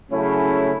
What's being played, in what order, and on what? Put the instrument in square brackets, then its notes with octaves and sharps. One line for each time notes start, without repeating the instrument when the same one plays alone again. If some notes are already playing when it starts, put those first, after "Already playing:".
[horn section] C#3 F#3 A3 C#4 E4